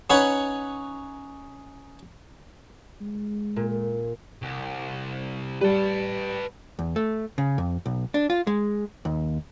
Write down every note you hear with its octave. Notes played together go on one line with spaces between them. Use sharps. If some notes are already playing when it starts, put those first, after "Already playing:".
C#4 D#4 B4 C#5 F#5
G#3
A#2
C2
G3 B4 A5
E2
A3
C#3
F2
B1
D4
F4
G#3
D#2